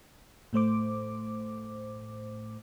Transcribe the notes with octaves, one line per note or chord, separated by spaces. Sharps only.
A2 A3 C5 D6